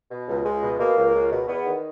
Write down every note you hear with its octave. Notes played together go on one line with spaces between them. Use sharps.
B2
C#2
C#2 G#3
B2
B2 A#3
C#2
C#2
B2
E2 B3
D#3